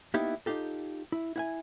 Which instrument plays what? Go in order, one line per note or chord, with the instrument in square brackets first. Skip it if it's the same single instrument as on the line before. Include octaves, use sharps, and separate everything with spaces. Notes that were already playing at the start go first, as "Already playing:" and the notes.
[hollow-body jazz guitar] A#3 B3 D#4 E4 G4
D#4 F4 G4 A4
E4
E4 F#5 G#5